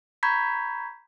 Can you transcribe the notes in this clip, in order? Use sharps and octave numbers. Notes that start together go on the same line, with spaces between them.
A#5 B5 C#6 G6 G#6 B6